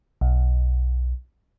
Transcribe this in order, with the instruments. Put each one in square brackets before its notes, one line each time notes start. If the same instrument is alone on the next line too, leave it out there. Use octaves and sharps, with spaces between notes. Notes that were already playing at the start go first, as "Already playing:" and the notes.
[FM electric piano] B1